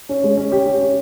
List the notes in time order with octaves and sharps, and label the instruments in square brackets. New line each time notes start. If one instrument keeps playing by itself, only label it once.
[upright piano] C#4
G#3
C#4
G4
C#4
G4